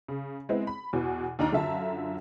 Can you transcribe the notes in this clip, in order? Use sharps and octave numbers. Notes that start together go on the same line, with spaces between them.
C#3
G#3 B3 C4 E4
B5
E2 B2 E3
D#2 D4 D#4 A#5
F#2 D3 F4 E5 A5 A#5